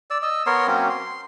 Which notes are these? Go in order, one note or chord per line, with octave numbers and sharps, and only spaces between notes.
D5 E6
D#5 E6
B3 A#4 C#5 C6
F#3 A#3 C4 C#4
C6